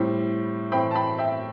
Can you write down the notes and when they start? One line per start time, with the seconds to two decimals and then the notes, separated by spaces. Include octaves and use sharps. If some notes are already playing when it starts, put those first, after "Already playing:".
Already playing: A2 G3 C4 E4
0.72 A2 E3 A3 C4 G5 B5
0.91 A5
0.95 G5 B5
1.18 E5 G5